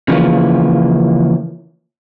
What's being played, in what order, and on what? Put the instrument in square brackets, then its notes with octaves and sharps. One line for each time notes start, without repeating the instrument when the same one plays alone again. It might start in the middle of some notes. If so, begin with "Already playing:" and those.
[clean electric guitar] C#3 E3 F3 A#3